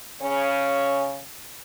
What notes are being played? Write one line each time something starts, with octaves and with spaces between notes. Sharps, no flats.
C#3 C#4